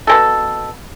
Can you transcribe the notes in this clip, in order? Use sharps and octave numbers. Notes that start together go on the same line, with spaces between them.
B2 G#3 A4